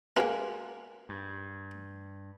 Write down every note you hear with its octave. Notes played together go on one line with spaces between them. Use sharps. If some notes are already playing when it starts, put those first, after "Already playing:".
G#3 A#3 B3 C#4 F#4 A#4
G2